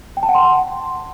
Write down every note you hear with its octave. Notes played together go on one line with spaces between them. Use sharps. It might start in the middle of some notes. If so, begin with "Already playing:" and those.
G5
A5
F#5
C6